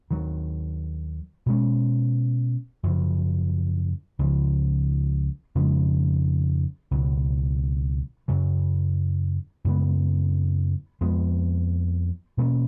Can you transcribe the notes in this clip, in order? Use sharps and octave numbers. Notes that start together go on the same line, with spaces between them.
D#2 D#3 F#3
B2 G#3 C#4
F#2 C#3 F3
C#2 C#3 F3
F2 C#3 F3 G#3
C#2 B2 F#3
F#2 C#3 F#3
F#2 C#3 G#3 B3
F2 F3 G#3 B3
B2 A#3 C#4